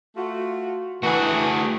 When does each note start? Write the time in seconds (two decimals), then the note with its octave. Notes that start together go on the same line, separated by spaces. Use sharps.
0.17 A3 F4 F#4
1.03 E3 A3 F#4 G#4 F#5